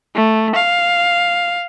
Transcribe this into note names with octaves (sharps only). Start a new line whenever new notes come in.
A3
F5